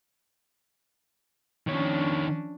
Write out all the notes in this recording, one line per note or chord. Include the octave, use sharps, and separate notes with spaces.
D#3 F3 C#4 D4 C#5